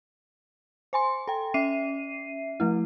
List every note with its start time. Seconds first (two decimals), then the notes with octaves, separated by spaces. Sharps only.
0.93 C5 G#5 C6
1.28 A4 G5
1.54 C#4 E5 C7 D#7
2.60 F3 A3 E4